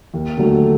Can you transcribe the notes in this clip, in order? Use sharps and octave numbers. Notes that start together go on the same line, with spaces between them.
D#2
D3 F#3 A3